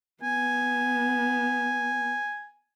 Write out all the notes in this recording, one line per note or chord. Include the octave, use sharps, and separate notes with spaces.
B3 G#5